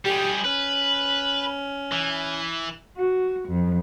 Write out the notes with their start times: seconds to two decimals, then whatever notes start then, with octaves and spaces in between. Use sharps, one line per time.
0.05 G3 G4 G#4
0.45 C#4 B4
1.92 E3
2.97 F#4
3.48 F2